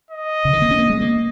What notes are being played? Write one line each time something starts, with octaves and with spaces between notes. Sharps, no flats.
D#5
C#3
D#3
A#3
C#4
A#3
G#3
A#3